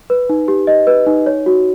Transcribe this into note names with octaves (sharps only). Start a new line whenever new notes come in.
B4
D#4
G4
D#5
B4
D#4
C#5
F#4